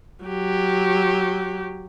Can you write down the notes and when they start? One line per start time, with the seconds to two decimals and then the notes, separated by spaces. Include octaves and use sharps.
0.25 F#3 G4